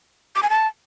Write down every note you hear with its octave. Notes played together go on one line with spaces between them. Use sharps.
D6
G#5
A5